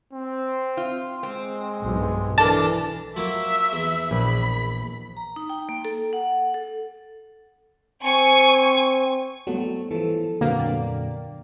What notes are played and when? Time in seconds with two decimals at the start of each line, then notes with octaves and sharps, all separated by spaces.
0.13 C4
0.77 F4
1.23 G#3 C4
1.79 B1 G2
2.38 E3 D4 A4 A#4 A5
3.16 F3 F#3 A#3 E5
3.73 E2
4.11 A#1 B5
5.17 A#5
5.36 D#4
5.49 G5
5.69 A#3
5.85 A4
6.13 F#5
6.54 A4
8.03 C4 G#5 C#6
9.47 F#3 G3 A3 B3
9.91 E3 F3 A4
10.41 F2 A#2 D3 F#3 A#3 B3
10.59 D5 G5